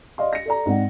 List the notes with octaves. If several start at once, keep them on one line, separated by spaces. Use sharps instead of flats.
D5 D#5 F5 C6
A#6 C#7
A4 D5 A#5
G#2 C4 D5 F#5